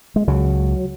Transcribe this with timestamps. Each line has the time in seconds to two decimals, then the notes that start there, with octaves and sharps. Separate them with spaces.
0.16 G#3
0.28 C#2 C#3 F#3